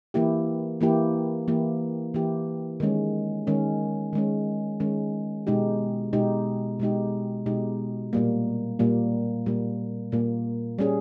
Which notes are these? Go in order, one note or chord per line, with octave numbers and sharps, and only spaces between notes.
E3 A#3 E4 G4
E3 A#3 E4 G4
E3 A#3 E4 G4
E3 A#3 E4 G4
D#3 G#3 C#4
D#3 G#3 C#4
D#3 G#3 C#4
D#3 G#3 C#4
B2 G#3 D#4 G4
B2 G#3 D#4 G4
B2 G#3 D#4 G4
B2 G#3 D#4 G4
A#2 G3 A#3
A#2 G3 A#3
A#2 G3 A#3
A#2 G3 A#3
G3 C#4 G#4